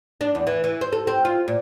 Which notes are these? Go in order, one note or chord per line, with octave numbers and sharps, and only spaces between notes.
D4
E2
E3
E3
C5
A4
C4
F4
A#2